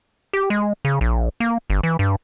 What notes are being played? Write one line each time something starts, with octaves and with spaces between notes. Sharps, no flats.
G4
G#3
C#3
A#1
A#3
G1
E3
G2